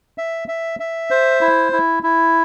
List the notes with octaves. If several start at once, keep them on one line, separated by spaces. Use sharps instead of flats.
E5
E5
E5
C5
E4
E4
E4